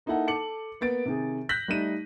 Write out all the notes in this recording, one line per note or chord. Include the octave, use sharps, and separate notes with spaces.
A#3 D#4 E4 A4 F#5
A4 D6 C#7 F#7
A#3 B3 A6 D7
C3 D#3 G#4
F#6 G6 A#6 B6 F#7
G3 A3 D#4 D#7